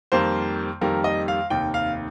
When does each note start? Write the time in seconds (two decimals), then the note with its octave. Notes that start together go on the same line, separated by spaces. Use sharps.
0.12 F2 D#3 G3 A#3 C5
0.81 F2 D#3 G3 A#3 A#4
1.04 D#5
1.28 F5
1.50 F1 D#2 D#3 G5
1.74 F5